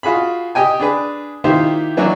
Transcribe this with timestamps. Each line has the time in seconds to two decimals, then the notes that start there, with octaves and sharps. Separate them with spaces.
0.03 F4 F#4 G#4 B5
0.55 G4 D#5 G5 G#5
0.80 D4 G#4 B4
1.44 D#3 A#3 E4 F4 G4 C5
1.97 E3 F#3 A#3 D4 E4 F#4